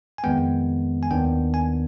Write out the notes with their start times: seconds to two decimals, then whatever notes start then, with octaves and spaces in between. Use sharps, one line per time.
0.18 G#5
0.24 F2 D#3 G#3 B3 G5
1.03 G#5
1.11 D#2 D#3 B3 D4 G5
1.54 G#5